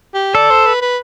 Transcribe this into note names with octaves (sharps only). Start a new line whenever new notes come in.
G4
A4 D5
C5
B4
B4